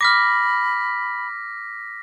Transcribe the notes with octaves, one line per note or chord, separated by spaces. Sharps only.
B5 D6 F6 A#6 B6